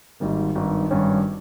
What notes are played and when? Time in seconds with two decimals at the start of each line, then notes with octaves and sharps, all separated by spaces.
0.20 G#1 G#2 G3 A#3
0.55 G#1 G2 D#3
0.91 G#1 G2 G3 C#4 G4